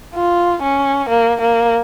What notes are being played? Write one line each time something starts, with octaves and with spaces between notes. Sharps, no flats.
F4
C#4
A#3
A#3